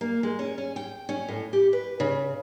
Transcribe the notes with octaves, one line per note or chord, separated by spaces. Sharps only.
A#3
G#3
C#4
C#4
G5
C#4
A2
G4
B4
C#3